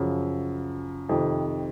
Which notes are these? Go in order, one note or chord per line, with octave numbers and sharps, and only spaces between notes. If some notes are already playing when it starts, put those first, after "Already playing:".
Already playing: F#2 C#3 F3
F2 C3 D#3